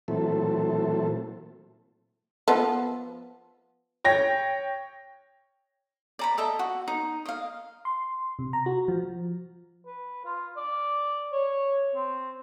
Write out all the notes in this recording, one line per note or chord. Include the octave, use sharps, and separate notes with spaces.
A#2 E3 F#3 A3 C4 A4
F3 B3 A4
C#5 G5 A#6
D5 A#5 B5
A4 D#5 E5
F#4
D#4
D#5 F5
C6
C3
A#5
F#4
F3
B4
F4
D5
C#5
C4